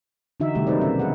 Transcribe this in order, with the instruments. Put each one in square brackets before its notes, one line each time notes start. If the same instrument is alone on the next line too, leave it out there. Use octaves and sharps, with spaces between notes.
[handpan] D3 E3 D#4 F#4 E5
C3 D#3 G3 A3 G4
F#3 A#3 D#4 B4 C5 D5
B2 C4 C#4 E5
G#4 B4 F#5